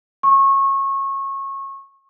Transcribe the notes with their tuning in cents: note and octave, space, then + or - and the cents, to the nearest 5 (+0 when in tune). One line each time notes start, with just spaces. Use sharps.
C#6 -25